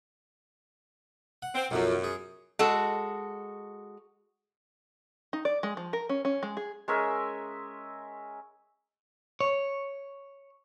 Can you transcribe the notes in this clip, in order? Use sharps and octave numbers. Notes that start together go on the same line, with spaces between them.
F#5
C4
B1 F#2 F3 F#3
G#4
G#3 F#4 A4
D#4
D5
G#3
F3
A#4
C#4
C#4
G#3
G#4
G#3 C#4 A#4 E5
C#5